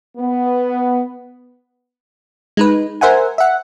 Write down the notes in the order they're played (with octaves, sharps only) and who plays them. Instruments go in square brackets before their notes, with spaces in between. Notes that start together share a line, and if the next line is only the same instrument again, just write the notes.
[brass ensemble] B3
[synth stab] G#3 D#4 B4
A#4 C5 E5 F#5 G#5
E5 F#5